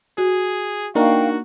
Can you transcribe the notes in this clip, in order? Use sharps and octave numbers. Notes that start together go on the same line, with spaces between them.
F#4 G#4
A#3 D4 D#4 F#4 A#4 F5 G5 C#6